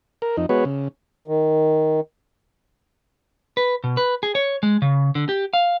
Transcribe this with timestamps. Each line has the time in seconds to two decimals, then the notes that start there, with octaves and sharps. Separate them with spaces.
0.22 A#4
0.37 F2 D#4
0.49 G#3 B3 F#4 B4 C#5
0.65 C#3
1.28 D#3
3.57 B4
3.84 B2
3.97 B4
4.23 G#4
4.35 C#5
4.63 G#3
4.82 C#3
5.15 D3
5.29 G4
5.54 F5